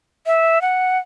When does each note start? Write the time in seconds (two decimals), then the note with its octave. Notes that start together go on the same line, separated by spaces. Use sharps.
0.26 E5
0.62 F#5